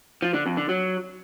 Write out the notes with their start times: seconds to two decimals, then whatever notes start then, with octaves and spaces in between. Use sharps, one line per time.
0.22 F3
0.34 D3
0.46 F2
0.57 D3
0.69 F#3